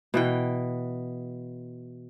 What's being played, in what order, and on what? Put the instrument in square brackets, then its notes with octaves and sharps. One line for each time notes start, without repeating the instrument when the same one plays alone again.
[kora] B2 E3 G5